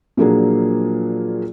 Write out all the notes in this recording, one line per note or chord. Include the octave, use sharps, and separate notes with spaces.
A#2 F3 F#3 A#3 D4 G#4